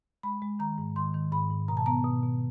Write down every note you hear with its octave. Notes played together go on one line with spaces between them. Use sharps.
G#3 B5
G#3
D#3 A#5
G#2
D#3 C6
D#3
G#2 B5
G#2
B2 A#5
A5
B3 A#5
B2
B2